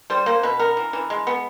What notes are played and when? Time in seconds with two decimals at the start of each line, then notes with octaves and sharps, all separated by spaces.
0.10 G3 C5
0.26 A#3 C5
0.43 B2 B4
0.59 B3 A#4
0.77 E3
0.93 E3
1.10 G#3
1.27 B3